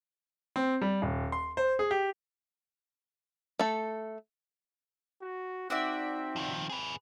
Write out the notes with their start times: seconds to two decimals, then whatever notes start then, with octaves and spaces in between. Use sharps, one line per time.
0.56 C4
0.81 G3
1.02 D#1
1.32 C6
1.57 C5
1.79 G#4
1.91 G4
3.59 A3 A4
5.21 F#4
5.70 C4 D#4 F#4 D5 E5
6.36 D#3 F3
6.69 G#4 B4